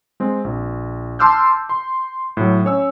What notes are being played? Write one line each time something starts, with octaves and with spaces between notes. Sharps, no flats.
G#3 C4
A#1
A5 C6 D6 E6 F6 G6
C6
A2 F#3
C#4 C#5 E6